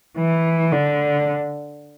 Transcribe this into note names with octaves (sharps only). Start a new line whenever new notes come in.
E3
D3